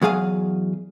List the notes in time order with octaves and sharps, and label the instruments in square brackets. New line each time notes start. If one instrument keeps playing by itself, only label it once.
[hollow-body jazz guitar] E2 F#3 G#4 F5 G#5